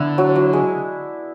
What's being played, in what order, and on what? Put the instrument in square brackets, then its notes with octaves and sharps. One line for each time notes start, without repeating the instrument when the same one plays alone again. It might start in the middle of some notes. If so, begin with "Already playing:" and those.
Already playing: [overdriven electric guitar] D3 [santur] B3 D4 E4
[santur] F#3
F#3
G#3